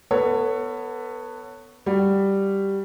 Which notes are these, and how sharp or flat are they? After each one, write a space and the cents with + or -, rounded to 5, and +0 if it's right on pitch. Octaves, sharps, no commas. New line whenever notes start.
B3 +0 A4 +30 C#5 +0
G3 +0 F#4 +0